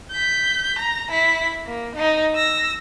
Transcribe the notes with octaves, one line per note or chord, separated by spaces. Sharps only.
G6 B6
A#5
E4 B6
A#3
D#4
E6 A#6